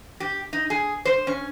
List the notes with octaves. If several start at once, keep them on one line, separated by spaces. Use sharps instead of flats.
G4
D#4
G#4
C5
C#4